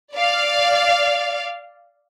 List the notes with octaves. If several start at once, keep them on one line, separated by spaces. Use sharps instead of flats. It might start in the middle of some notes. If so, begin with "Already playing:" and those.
D5 F5